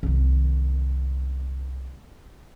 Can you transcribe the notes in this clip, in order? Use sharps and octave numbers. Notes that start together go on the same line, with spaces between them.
C2 D#3